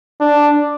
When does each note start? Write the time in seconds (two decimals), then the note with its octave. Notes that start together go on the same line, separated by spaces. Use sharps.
0.21 D4